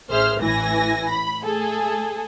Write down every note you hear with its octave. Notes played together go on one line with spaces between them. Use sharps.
A1 G#4 C5 E5 F6
A1 A2 E3 E4 G#5 A#6
B5
A3 G#4 A4